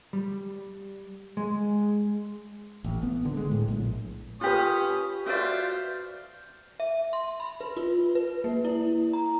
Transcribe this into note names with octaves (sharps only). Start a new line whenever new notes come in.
G3
G#3
A1
B3
D3
G#3
A2
A#1
C#4 F4 G4 B4 D#6
F4 F#4 B4 C5 D5 E5
E5
C6
B5
B4
F4
B4
A#3
E4
A#5